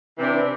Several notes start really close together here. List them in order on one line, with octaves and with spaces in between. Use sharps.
E3 C3 D4